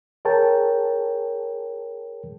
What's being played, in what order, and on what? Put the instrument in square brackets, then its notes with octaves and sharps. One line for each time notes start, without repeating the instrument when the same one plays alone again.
[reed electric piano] G#4 A#4 C#5 G5 A5